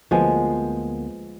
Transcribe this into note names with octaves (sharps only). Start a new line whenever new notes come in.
D2 F3 G#3 A#3 B3